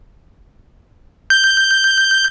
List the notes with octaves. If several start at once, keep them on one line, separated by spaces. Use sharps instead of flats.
G6